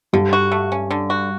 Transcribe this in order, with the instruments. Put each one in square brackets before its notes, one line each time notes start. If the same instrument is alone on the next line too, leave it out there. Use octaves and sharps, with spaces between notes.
[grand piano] G2 G3 [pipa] D3
[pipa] F#4
A3
C#4
D3
F#4